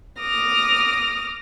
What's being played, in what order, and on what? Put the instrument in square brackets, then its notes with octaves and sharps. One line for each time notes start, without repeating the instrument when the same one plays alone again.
[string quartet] D6 D#6 F6 A#6